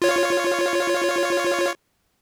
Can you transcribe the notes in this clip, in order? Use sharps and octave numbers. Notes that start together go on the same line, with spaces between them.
F4 C#5